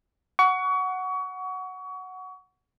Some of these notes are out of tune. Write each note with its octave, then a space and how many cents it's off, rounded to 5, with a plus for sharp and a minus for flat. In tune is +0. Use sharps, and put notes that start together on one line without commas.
F#5 +0 C#6 +30